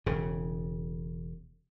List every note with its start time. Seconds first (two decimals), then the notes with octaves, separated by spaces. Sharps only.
0.06 E1 C#3